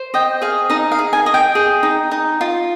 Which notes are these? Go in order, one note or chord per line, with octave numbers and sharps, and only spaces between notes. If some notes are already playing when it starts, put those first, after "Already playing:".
Already playing: C5
D#5 G5
G#4 F5
D#4 D#5
F5
G#4
G#5
D#5
G5
G#4
D#4
D#4
F4